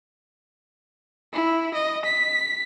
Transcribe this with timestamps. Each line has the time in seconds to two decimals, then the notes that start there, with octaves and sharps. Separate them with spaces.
1.33 E4
1.74 D#5
2.05 B6